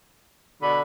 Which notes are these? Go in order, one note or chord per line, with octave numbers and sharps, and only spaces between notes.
B2 D3 B5